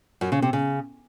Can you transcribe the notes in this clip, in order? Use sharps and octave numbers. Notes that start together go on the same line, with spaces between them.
F#2
C#3
C3
C#3